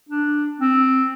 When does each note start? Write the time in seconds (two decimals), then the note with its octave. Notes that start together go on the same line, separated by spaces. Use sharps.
0.09 D4
0.60 C4